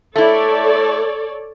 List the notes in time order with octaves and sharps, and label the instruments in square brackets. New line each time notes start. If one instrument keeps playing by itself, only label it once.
[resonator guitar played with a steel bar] A3 E4 [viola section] A4 C#5 D5